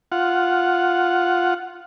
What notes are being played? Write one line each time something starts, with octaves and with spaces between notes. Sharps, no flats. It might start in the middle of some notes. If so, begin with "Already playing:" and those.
F4 F#5